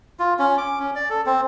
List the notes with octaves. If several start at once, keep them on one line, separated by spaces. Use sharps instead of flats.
F4
C#4
D6
C#4
D5
A4
C4